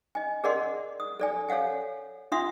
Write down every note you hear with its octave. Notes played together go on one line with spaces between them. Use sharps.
D#5 G#5
G#4 A#4 D5 D#5 F#5 C6
D#6
A4 D5 G#5
A4 C#5 F5 F#5 G#5
D4 F4 E5 F#5 C6 D#6